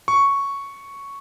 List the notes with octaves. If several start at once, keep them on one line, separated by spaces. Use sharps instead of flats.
C#6